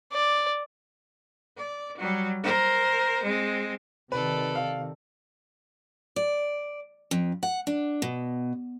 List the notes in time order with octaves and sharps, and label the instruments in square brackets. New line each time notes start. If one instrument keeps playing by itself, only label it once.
[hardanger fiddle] D5
[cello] D5
F#3 G3
A#4 C5
G#3 C4
[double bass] C3 [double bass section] D#3 [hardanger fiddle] A4 D5 [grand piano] B4
[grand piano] F5
[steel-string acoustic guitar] D5
F2
F#5
D4
B2